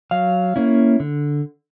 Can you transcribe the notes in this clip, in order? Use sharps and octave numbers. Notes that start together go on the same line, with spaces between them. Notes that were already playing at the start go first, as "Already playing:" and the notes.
F#3 F5
A#3 C#4 E4
D3